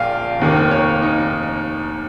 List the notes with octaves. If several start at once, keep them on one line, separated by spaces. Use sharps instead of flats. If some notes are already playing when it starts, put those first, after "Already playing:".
Already playing: A#1 A#2 F5 G5 G#5
F1 D#2 D#3 A#3
C#5
D#4